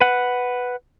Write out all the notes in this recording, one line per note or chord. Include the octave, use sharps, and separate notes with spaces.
B4 F#5